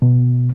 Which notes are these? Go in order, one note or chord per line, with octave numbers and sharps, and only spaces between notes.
B2